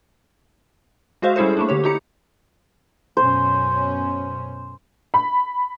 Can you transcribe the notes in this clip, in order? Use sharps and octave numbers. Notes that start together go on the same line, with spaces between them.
G#3 F#4 G#4 C5 E5 F5
G3 C#4 E4 G#4 A4 C5
A3 A#3 D4
D3 G4 C#5
D#4 E4 G4 A#5 C#7
F#2 B2 C#4 C5
B5